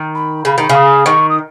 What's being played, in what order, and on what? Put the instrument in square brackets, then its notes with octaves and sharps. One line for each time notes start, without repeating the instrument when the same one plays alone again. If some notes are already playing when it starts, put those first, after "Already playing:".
Already playing: [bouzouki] D#3
[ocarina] B5
[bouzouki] C#3 [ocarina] B5
[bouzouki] D#3
C#3
[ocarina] D#6
[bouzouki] D#3 [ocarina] C#6
[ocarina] D#6